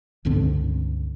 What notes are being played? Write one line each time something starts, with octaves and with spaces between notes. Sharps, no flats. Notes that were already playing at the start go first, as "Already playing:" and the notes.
C#2 G2 D3 C4